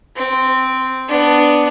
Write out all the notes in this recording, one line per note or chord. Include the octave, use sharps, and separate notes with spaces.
C4
B3 D4